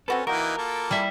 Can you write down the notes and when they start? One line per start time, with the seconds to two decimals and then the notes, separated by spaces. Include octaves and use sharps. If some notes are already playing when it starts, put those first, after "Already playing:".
0.08 C4 C#4 F#4 A4 B4
0.27 E3 A#3 D#4 F#4 A#4 G5
0.58 A#3 F4 A4
0.91 G3 E4 E5